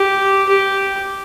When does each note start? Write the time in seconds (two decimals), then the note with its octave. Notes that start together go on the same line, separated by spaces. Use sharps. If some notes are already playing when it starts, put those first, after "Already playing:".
Already playing: G4
0.48 G4